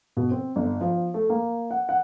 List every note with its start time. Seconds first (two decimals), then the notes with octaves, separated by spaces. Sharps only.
0.17 B2
0.31 C4
0.56 G1
0.81 F3
1.14 A3
1.30 A#3
1.71 F#5
1.89 F#5